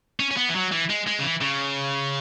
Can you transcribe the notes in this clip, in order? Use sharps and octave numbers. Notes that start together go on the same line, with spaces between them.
C#4
C#4
B3
E3
F#3
E3
G#3
G#3
C#3
E3
C#3